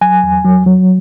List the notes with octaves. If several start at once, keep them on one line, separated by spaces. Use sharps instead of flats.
F#3 G#5
E2
F#3
F#3